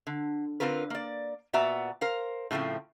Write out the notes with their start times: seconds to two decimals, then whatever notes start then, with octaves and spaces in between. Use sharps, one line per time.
0.07 D3
0.60 D3 C4 F4 A#4 B4
0.90 A#3 D5
1.53 A#2 B3 F#4 D5 E5 A#5
2.01 A#4 C5 F5
2.51 A2 C#3 F3 A3 C4